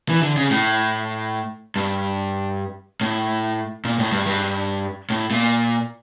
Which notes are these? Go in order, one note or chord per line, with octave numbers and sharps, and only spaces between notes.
E3
D3
C#3
A2
G2
A2
A#2
A2
G2
G2
A2
A#2